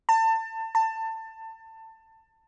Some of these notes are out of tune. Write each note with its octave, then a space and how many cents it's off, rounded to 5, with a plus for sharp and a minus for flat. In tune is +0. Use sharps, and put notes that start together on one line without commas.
A5 +30
A5 +25